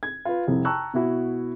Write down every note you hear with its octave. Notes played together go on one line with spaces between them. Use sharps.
G#6
F4 B4
C2 F2 C3
G5 A5 A#5 C#6 E6 F#6
B2 E4 F#4